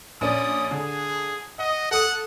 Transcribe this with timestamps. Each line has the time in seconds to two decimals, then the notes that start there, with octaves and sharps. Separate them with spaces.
0.21 A#1 C#4 D5 D#6
0.71 D3 G#4
1.59 D#5 F#5
1.91 A4 F#5 D#6